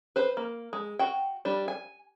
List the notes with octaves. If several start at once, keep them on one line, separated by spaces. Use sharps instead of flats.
B4 C5
A#3
G#3
F#4 G5
G3 D4
G#5